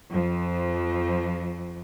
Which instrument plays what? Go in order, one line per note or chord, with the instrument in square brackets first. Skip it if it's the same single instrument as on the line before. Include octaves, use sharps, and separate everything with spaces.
[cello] F2 F3